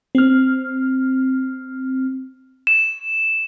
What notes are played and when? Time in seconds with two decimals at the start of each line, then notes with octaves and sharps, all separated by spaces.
0.15 C4 F6
2.67 E7